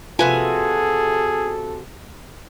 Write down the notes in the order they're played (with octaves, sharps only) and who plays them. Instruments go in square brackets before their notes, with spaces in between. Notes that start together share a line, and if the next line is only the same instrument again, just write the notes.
[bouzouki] C3 F#4 G#5 [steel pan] F4 B4 F5 [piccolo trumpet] G#4 [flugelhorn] A4